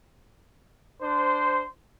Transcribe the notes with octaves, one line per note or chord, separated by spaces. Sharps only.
D4 C5